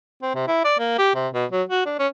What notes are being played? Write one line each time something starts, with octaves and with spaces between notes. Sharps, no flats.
C4
C3
E4
D5
A#3
G4
C3
B2
F#3
F#4
D4
C#4